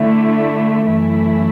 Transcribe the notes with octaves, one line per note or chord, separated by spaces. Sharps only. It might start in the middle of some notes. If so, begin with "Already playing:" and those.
Already playing: D3 A3 E4
F#2 E3 A3 E4